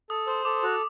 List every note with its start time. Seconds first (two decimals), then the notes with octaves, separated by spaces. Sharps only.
0.10 A4 D#6
0.27 C5 D#6
0.45 A4 D6
0.63 F#4